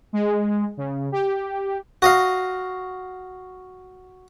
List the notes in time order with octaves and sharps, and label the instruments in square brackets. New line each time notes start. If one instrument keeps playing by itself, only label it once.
[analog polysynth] G#3
C#3
G4
[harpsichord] F#4 D#5 F5